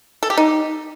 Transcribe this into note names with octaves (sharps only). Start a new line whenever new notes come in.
A4
G4
D#4